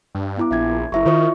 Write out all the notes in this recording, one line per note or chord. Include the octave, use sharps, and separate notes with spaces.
G2
B3 E4 D6
A#1 E5 G#6
F#1 E4 E5 C#6
D#3 F4 C5 C#6